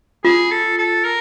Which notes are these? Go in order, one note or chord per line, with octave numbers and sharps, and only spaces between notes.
F4 G#4
A4
A4
A#4